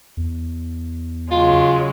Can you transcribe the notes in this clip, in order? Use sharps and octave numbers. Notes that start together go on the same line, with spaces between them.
E2
C#3 F#3 G#3 F4